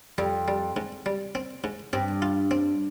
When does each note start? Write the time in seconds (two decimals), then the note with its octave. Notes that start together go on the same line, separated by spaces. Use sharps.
0.18 F2 G3
0.48 G3
0.76 G#2
1.06 G3
1.35 C4
1.64 G#2
1.93 G2 C4
2.22 F4
2.51 C4